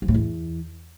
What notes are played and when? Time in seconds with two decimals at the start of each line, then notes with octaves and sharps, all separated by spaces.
0.02 F3
0.08 A2
0.14 E2